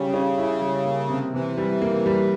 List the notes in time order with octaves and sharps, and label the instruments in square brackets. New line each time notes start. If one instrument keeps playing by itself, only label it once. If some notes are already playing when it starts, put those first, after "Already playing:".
Already playing: [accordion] C#3 [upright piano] G3 G4
[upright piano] C#4
E4
G3
A#3
C3
[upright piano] C3 [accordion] E3
[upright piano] G3
A#3
G3